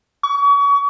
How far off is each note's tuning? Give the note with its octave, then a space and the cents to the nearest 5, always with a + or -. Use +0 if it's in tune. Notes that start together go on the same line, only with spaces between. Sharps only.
C#6 +35